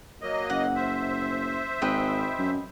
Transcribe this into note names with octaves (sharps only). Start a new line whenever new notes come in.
F#3 A#3 D#5
F#1 F#5
C5 E5
G#1 B4 D#5 G5
F#2